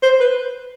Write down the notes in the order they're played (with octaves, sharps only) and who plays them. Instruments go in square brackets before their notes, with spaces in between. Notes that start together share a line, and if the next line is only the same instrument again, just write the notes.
[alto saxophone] C5
B4